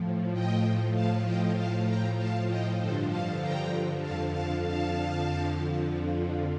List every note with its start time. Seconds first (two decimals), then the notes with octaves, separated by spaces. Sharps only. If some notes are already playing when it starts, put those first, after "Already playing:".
Already playing: A2 F3
0.32 A2 F3 D#5 G5
0.94 F5 A5
1.24 D#5 G5
1.55 A2 F3 F5 A5
1.86 G5 A#5
2.17 F5 A5
2.47 D#5 G5
2.79 G2 D3 F3 A4 C5
3.09 F5 A5
3.40 G5 A#5
4.01 F2 D3 F3 F5 A5
4.32 F5 A5
4.63 F5 A5
5.24 F2 D3 F3